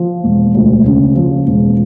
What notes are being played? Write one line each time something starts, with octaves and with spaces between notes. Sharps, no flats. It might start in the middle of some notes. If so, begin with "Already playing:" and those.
Already playing: F3
E1
D2
C#3
F3
E1